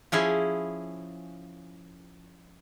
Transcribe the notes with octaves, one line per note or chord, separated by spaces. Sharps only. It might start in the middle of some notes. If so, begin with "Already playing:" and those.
F3 C#4 E4 G#4